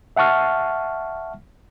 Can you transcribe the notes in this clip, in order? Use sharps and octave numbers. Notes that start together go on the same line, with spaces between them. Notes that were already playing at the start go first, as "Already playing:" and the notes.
E5 F#5 A5 C#6 F6